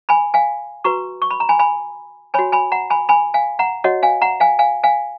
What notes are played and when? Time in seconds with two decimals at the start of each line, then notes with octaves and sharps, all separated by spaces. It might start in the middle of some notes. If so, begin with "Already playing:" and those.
0.09 G#5 B5
0.34 F5 G#5
0.84 F#4 B4 A#5 C#6
1.22 C#6
1.30 B5
1.40 A#5
1.49 G#5 B5
1.59 G#5 B5
2.34 F#4 C#5 G#5 B5
2.52 G#5 B5
2.72 F#5 A#5
2.90 G#5 B5
3.09 G#5 B5
3.34 F5 G#5
3.59 F#5 A#5
3.84 F#4 C#5 D#5 F#5
4.03 F5 G#5
4.21 F#5 A#5
4.40 F5 G#5
4.59 F5 G#5
4.84 F5 G#5